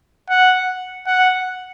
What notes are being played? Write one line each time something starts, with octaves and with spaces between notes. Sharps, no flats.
F#5
F#5